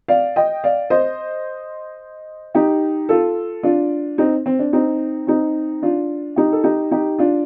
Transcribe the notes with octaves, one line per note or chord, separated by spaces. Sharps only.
D5 F5
D#5 G5
D5 F5
C5 D#5
D#4 G4
F4 A4
D4 F4
C4 D#4
C4
D4
C4 D#4
C4 D#4
D4 F4
D#4 G4
A4
D#4 G4
D#4 G4
D4 F4